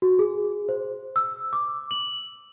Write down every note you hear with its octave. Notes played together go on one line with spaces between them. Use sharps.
F#4
G#4
C5
E6
D6
F#7